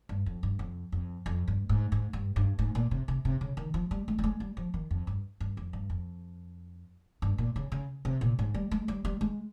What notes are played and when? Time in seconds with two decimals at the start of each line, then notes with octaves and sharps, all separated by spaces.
0.09 G2
0.26 F2
0.43 G2
0.59 F2
0.92 F2
1.26 F2
1.48 G2
1.69 G#2
1.92 G#2
2.13 G2
2.36 G2
2.59 G#2
2.75 A#2
2.91 C3
3.08 C3
3.25 C3
3.41 C#3
3.57 D#3
3.74 F3
3.91 G3
4.08 G#3
4.19 G3
4.24 G#3
4.40 G3
4.57 F3
4.74 D#3
4.91 F2
5.07 G2
5.40 G2
5.57 F2
5.73 G2
5.90 F2
7.22 G2
7.38 A#2
7.56 C#3
7.72 C#3
8.05 C3
8.21 A#2
8.39 G#2
8.54 G3
8.71 G#3
8.88 G3
9.05 G3
9.21 G#3